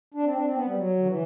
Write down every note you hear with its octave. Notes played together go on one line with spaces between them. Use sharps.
D4
C4
D4
C4
B3
G3
F#3
D3
E3